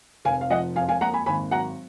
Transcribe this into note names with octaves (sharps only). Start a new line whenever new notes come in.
F1 F5 G#5
F5
F3 D#5 F#5
F2 F5 G#5
F5 G#5
A#3 F#5 A#5
G#5 B5
G#1 G#5 B5
F#3 F#5 A#5